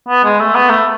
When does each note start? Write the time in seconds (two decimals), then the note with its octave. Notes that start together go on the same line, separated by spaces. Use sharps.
0.09 B3
0.24 G#3
0.40 A3
0.55 B3
0.70 A3